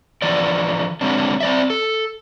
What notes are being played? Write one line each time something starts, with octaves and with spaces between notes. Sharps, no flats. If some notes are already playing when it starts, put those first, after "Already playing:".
D3 E3 F3 D5
D3 F#3 G#3 C4 D4
C4 D5 E5
A4